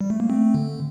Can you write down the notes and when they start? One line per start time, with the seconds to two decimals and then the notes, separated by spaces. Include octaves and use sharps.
0.01 G3
0.10 A3
0.20 A#3
0.29 A3 C4
0.54 D3